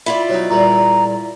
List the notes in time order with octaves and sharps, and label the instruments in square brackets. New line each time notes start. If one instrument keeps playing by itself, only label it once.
[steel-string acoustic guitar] E4 F4 D5 [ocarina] B5
[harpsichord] B2 F#3 D#4 [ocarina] C#5
[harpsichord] E2 A#2 G3 [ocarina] A#5